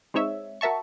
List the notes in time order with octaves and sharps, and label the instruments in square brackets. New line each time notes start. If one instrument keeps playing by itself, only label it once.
[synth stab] G#3 C4 D#4 C#5 E5
F#4 A#4 E5 A5 C#6